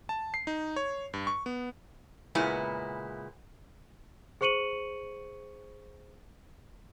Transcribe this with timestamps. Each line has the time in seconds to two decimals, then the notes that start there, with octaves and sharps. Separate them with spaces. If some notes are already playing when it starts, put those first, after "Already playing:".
0.09 A5
0.34 C7
0.47 D#4
0.76 C#5
1.14 G2
1.27 C#6
1.46 B3
2.35 A#2 C#3 G#3 B3 E4
4.41 G#4 C5 C#6 C#7 D#7 F#7